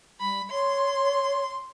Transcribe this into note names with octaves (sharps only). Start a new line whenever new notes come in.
G3 B5
C#5 C6